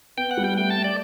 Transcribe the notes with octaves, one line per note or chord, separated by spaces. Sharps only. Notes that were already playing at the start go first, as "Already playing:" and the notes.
B3 G5
F#5
G3
G5
A3 G5
A5
A3
D5